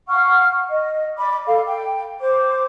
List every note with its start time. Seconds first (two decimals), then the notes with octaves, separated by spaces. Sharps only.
0.08 F5 F#5 C#6 F6
0.70 D#5
1.17 D5 B5 D6
1.46 A4 F5
1.65 G5
2.20 C5 D6